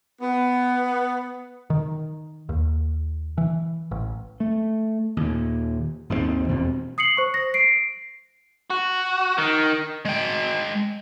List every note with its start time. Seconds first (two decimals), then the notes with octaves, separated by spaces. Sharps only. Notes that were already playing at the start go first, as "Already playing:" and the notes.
0.22 B3
1.70 D#3
2.49 D#2
3.38 E3
3.91 A1
4.40 A3
5.17 D#2 A#2
6.10 G#1 D#2 D3 C4
6.48 E1 E2 B2 C4
6.98 D#6 C7 C#7 F#7
7.17 C5 C#6
7.34 A#6
7.54 C7 D7
8.70 F#4
9.38 D#3
10.05 G#3 G5